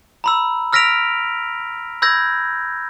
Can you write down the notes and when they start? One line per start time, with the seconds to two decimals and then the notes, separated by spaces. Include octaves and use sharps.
0.24 A#5 B5 E6
0.73 E6 F6 A#6 B6 D7 F7
2.02 B5 E6 G6 G#6 A#6